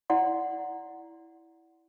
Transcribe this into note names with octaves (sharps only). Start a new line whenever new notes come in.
E4 D5 F#5 C6